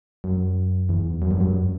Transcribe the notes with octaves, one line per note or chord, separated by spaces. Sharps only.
F#2
E2
F#2
G2
F#2